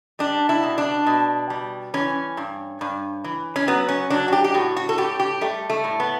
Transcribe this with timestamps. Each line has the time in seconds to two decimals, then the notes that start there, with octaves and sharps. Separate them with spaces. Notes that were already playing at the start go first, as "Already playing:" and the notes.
0.19 G3 D4
0.49 E4
0.63 B2
0.78 D4
1.06 B2
1.50 G3
1.94 E3 C#4
2.37 G2
2.81 G2
3.24 E3
3.56 C#4
3.68 F#3 B3
3.88 C#4
4.10 F#3 D4
4.28 F#4
4.33 G4
4.44 G4
4.54 A2 F#4
4.77 F#4
4.89 A4
4.98 A2 G4
5.19 G4
5.41 G3 A3
5.70 A3
5.84 A2
6.00 B3